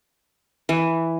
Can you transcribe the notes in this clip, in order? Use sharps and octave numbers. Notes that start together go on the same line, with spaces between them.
E3